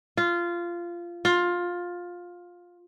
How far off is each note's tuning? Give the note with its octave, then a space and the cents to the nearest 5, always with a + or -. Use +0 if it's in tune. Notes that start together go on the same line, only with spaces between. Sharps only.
F4 -15
F4 +15